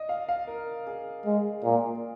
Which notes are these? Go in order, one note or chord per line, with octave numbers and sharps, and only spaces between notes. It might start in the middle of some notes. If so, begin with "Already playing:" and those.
Already playing: D5 D#5
F5
F5
A#4
G#4
G#3
A#2